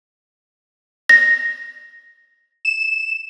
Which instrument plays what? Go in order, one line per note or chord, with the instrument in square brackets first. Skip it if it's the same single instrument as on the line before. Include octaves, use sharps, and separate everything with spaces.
[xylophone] A#6
[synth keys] E7